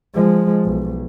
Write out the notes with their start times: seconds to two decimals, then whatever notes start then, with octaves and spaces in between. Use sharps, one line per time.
0.14 F3 G#3
0.65 B1